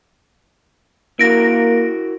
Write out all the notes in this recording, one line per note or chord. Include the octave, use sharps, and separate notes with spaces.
A#3 E4 F#4 A#4 A#6 D7